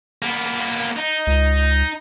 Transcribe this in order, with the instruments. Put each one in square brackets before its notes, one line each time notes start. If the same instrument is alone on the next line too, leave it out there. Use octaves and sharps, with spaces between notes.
[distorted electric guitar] A#3 B3
D#4
[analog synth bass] C#2